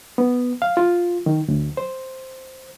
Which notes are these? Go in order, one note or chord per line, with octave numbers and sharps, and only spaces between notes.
B3
F5
F4
D#3
D2
C5